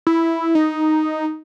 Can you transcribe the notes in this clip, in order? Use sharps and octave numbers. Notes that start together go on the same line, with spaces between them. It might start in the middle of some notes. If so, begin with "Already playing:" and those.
E4
D#4